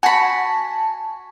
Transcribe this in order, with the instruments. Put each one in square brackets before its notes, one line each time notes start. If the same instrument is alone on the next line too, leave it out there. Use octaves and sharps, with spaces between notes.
[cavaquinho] F#4 B5 [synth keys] G#5 A5